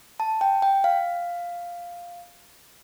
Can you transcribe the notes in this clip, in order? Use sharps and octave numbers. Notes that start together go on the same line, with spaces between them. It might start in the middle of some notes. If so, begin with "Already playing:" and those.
A5
G5
G5
F5